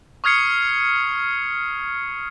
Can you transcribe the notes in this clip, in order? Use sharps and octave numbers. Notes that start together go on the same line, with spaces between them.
C#6 D#6 F6 G#6 C7 C#7